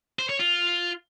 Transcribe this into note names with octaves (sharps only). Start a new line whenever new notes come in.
C5
C#5
F4